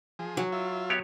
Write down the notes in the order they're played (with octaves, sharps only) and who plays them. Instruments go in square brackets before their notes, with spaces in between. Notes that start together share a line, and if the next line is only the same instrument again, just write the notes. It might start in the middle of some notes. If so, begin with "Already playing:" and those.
[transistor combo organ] F3 G#4
[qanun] F#3
[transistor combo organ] F4 E5
[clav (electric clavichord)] B3 G4 C#5